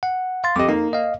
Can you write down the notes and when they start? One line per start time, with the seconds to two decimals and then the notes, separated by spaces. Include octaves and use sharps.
0.03 F#5
0.44 F5 C6 A6
0.56 F2 G4 D#5 D6
0.69 A#3 D#4
0.93 D#5 F5